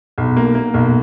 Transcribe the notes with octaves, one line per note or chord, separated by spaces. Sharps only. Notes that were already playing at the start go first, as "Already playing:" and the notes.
B1
A#3
A#3
B1